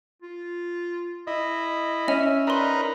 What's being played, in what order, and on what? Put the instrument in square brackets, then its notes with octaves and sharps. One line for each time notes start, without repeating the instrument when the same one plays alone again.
[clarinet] F4
[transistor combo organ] E4 [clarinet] D#5
[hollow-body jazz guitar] C#4 [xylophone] D#5 [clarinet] E5
[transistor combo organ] D#4 A#4 B4 [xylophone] D5 C6